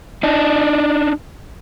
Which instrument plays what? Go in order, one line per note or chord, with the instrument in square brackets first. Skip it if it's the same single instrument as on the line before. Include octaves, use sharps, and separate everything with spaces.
[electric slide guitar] D4 D#4